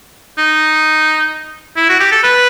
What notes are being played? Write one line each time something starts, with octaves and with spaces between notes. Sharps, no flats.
D#4
E4
F#4
G4
A4
B4